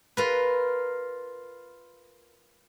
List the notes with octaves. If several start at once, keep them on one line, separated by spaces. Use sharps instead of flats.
F4 A#4 B4